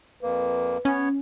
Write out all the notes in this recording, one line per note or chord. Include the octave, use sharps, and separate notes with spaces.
F2 A#3 B4
B3 C#4 C#5